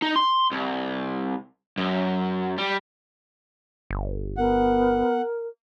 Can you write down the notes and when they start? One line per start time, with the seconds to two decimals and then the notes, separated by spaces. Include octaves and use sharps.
0.02 D#4
0.16 C6
0.52 C2
1.78 F#2
2.58 G3
3.91 G1
4.37 B3 A#4 F#5